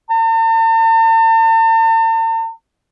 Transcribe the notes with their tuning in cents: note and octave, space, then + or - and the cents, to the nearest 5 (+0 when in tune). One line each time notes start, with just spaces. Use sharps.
A5 +45